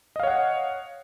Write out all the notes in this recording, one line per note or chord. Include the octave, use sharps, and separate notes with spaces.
C#5 D#5 F5 F#5